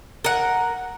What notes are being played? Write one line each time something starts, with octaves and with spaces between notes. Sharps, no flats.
A#4 F#5